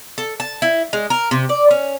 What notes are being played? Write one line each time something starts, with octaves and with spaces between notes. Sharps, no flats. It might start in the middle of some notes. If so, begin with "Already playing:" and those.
A4
A5
E4
G#3
A#4
C3
D5
C#4